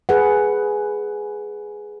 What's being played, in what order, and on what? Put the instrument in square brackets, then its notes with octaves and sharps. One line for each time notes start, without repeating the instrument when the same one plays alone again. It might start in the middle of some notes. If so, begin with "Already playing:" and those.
[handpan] G#4 B4 F#5